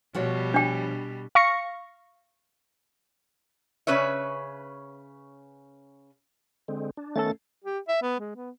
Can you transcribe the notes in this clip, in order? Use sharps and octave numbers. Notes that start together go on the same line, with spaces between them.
B2 F3 G3 F#4 C#5
D4 G5
F5 C#6 A#6 C#7
C#3 C#4 B4 C#5 E5
D3 G#3 C4
D4
D#3 A3 B3 C#4 A4 A6
G4
E5
B3
G#3
B3